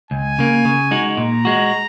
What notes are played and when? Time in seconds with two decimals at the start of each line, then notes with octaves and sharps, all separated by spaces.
0.11 C#2 G#5
0.38 C#3 A#3
0.65 C#3
0.91 G#3 D#4 F#4
1.17 A#2 A#5
1.45 G#3 F#4